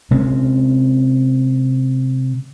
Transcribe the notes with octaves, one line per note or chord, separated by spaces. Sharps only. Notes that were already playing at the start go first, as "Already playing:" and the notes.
C3 G#3 C4 C#4